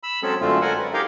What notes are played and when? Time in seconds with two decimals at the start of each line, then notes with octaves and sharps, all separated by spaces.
0.03 B5 E6
0.23 F#3 G#3 C4 C#4 G#4 A4
0.41 F#2 D3 G#3 A3 C4 F4
0.62 A4 A#4 F#5 G#5
0.78 B4
0.94 D#4 G4 G#4 A#4 F5 G5